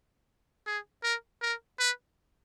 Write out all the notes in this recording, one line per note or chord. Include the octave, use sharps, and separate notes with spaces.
G#4
A#4
A#4
B4